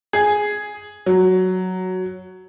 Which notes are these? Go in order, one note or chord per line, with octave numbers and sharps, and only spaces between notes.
G#4
F#3